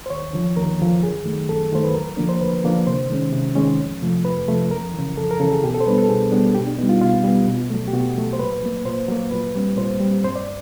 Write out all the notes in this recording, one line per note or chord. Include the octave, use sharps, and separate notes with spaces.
C5
D#2 C#5
D3 F3
D#2 A#4
D3 F3
F#2 G#4
D#3 F#3 A3
F#2 A4
D#3 F#3 A3 C5
B4
D2 A#4
D3 F3 A#3 D4
C5
D2 B4
D3 F3 A#3 D4
C3 C5
D#3 G#3 C#4
C3
D#3 G#3 C#4
F2
C3 F3 A3
F2 B4
C3 F3 A3
F2 A#4
C#3 E3
F2 A4
A#4
C#3 E3 A4
G#4
B2 G4
A4
C5
G3 B3 D4 B4
A4
B2 G#4
G3 B3 D4
B2 G4
D4
G3 B3 D#4
F4
B2 F4
G3 B3
B2
F#3 A3
G4
B2 F#4
F#3 A3
C5
A#2 B4
F#3 A#3
A#2 C5
F#3 A#3
A#2 B4
G3 C4
A#2 C5
G3 C4
G2 C5
D5